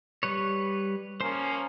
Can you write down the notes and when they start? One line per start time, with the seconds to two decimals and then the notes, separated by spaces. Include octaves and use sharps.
0.23 G3 B4 C#5
1.21 F3 A#3 C#4 C5 C6